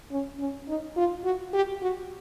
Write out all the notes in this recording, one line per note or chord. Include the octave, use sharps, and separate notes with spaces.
C#4
C#4
D#4
F4
F#4
G4
F#4